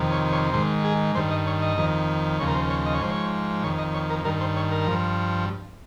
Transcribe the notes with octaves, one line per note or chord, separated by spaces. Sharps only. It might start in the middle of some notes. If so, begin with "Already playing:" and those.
Already playing: F2 C3 D#3
C#5
C#5
G#2 D#3 C5
G#4
G2 D#3 C5
D#5
C#5
D#5
F2 D#3
D#2 C#3 F3 C#5
A#4
C5
C#5
D#5
C#5
G#2 F3 C5
C#5
F2 D#3 C#5
D#5
C#5
A#4
G2 D#3 A#4
C5
C#5
A#4
G2 F3